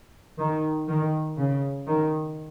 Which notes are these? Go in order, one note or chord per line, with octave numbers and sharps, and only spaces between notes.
D#3
D#3
C#3
D#3